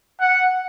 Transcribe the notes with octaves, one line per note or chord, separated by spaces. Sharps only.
F#5